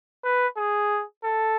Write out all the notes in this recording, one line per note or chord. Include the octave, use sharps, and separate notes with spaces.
B4
G#4
A4